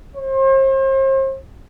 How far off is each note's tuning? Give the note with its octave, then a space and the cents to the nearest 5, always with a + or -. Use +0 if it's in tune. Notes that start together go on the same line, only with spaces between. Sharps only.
C5 +40